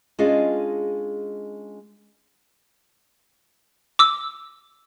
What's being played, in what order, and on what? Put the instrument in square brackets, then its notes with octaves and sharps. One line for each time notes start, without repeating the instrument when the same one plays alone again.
[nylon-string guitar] G#3 C#4 D4 F4 G#4 D#5
[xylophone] D6 E6